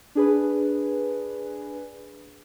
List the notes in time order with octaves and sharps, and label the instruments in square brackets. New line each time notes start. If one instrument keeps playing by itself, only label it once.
[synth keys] D4 G#4 B4